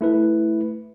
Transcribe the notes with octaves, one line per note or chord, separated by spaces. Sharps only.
A3 E4 B4